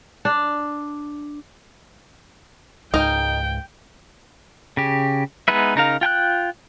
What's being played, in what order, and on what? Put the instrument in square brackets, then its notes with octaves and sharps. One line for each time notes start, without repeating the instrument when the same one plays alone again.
[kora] D4
[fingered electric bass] C#2 G#2 [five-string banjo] D#4 A#4 [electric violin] G5
[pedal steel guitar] C#3 G4
G#3 B3 D#4 B4 E5
C#3 D#4 A#4 F5
F4 G5 G#5 F#6